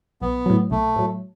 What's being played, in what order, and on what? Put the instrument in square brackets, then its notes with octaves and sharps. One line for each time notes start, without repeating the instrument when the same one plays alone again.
[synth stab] B1 [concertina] B3
[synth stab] A2 F#3
[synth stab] B1 [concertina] A3
[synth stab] A2 F#3